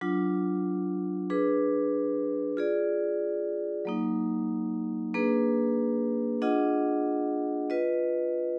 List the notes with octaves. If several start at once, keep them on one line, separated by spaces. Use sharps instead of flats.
F#3 D4 F4
D4 G#4 B4
F4 G#4 D5
F#3 A#3 D#4
A#3 D4 G#4 B4
D4 F4 G#4 D#5 F#5
F4 B4 D#5